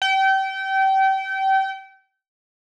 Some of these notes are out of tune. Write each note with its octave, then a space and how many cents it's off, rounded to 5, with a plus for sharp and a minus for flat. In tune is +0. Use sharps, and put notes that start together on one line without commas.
G5 -30